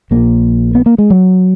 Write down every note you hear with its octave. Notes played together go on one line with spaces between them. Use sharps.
A#1 A#2 A#3
B3
A#3
G#3
F#3